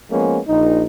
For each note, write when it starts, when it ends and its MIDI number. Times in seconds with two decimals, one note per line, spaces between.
0.11 0.40 53
0.11 0.40 56
0.11 0.40 58
0.11 0.40 59
0.11 0.40 61
0.48 0.85 34
0.48 0.85 63